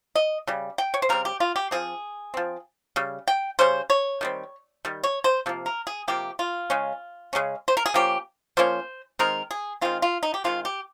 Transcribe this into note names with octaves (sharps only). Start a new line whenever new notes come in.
D#5
C#3 G3
G5
C#5
C5
C#3 G3 C4 A#4
G4
F4
G4
F3 C4 G#4
F3 C4
C#3 G3
G5
C#3 G3 C#4 C5
C#5
D#3 G3 C4
D#3 G3
C#5
C5
C3 F3 A#3
A#4
G#4
C3 F3 A#3 G4
F4
C#3 G#3 C#4
C#3 G#3 C#4
C5
A#4
G#4
F3 A#3 C#4 G4
F3 A#3 C#4 C5
D#3 G#3 C4 A#4
G#4
D#3 G#3 C4 F4
F4
D#4
G4
D#3 G#3 C4 F4
G4